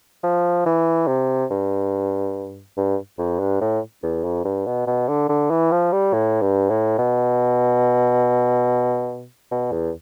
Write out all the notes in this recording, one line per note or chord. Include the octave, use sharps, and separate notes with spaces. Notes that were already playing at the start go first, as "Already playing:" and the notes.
F3
E3
C3
G2
G2
F2
G2
A2
E2
F2
G2
B2
B2
D3
D3
E3
F3
G3
A2
G2
A2
B2
B2
E2